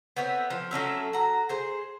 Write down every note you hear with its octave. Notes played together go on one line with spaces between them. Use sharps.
B3 C4 C#5 E5
F3
F#3 A3 C#4 E5
F#4 A#5
G#4 C5